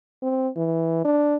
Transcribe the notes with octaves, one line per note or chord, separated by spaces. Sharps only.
C4
E3
D4